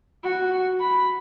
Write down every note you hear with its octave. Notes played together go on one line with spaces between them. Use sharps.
F#4
B5